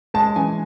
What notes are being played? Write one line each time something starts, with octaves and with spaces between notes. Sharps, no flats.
G#3 A5
E3 G#5